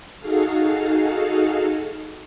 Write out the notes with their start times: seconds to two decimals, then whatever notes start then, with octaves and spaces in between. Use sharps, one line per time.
0.19 D#4 F#4 G#4 A4 F5